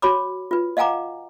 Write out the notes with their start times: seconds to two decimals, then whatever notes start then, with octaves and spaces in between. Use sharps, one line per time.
0.02 F#4 C#5 B5 D6
0.51 F4 B4
0.77 D#5 F5 F#5 G#5 A#5 D6